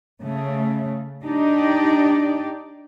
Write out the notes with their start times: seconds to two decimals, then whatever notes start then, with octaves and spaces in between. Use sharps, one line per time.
0.22 C#3 A3
1.24 D4 D#4 G4 D5